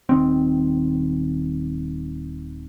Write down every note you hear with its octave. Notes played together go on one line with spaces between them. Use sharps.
D#1 D#3 C4